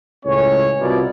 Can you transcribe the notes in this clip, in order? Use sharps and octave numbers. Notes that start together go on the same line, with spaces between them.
C#2 A2 C#4 C#5
C2 B2 E4 F4 A#4 D5